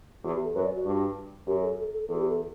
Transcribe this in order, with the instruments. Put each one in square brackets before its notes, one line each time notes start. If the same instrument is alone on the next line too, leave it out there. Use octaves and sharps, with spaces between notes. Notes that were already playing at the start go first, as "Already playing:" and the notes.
[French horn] E2 [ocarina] F#4
[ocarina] G4
A4
[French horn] F#2 [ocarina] B4
[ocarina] D5
F#4
[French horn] G2
[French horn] F#2 [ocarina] G4
[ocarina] A4
A4
A4
[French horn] E2 [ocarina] A4
[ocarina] F#4
G4
A4